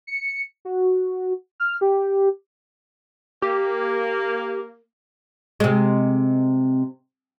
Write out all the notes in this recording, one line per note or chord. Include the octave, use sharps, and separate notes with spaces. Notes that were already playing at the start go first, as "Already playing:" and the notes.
C#7
F#4
F6
G4
A#3 G4
C3 G#3